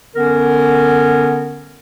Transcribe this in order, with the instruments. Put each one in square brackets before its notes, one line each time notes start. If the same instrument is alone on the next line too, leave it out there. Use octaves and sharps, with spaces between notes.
[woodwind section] D3 B3 C#4 A#4